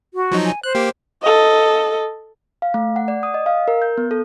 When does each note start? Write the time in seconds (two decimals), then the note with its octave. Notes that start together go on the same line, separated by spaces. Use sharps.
0.14 F#4
0.31 F3 F#3 D#4
0.45 G#5
0.63 C5 F#6
0.75 A#3 G4
1.22 A4 D#5
2.62 F5
2.74 A3
2.96 F#5
3.08 D5
3.23 D#6
3.34 D#5
3.46 F5
3.68 A#4
3.82 G6
3.97 B3
4.11 A4